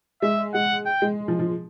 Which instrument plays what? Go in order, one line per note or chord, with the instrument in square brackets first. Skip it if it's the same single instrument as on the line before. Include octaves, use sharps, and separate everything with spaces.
[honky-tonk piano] G#3 [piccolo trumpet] E5
[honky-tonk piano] G#3 [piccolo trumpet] F#5
[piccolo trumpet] G5
[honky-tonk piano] G#3
F3
F3